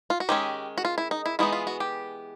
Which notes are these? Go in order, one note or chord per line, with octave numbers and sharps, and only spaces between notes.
F4
F#4
D#3 G#3 C#4 G4
F#4
F4
E4
D#4
E4
E3 G#3 B3 D#4 E4
F4
F#4
G4